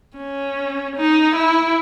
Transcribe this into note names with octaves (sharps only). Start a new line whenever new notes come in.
C#4
D#4
E4